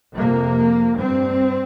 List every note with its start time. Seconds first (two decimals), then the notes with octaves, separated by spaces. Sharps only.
0.13 F2 C3 A#3
0.97 G2 C4